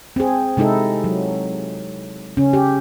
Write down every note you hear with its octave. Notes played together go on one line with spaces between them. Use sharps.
C4 G#4
C3 G#3 D#4 E4 A4
F#3
C#3 C#4
G4